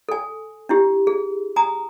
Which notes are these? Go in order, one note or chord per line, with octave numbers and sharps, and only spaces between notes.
A4 G#5
D4 E4 G4
G#4
G#5 A#5 D#6